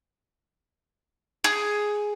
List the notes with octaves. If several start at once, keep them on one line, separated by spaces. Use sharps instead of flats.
G#4